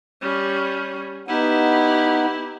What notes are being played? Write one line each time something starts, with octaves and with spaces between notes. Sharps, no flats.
G3 C#4
B3 D#4 E4 G4 F#5